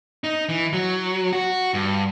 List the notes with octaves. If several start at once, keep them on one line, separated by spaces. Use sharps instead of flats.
D#4
E3
F#3
F#4
G2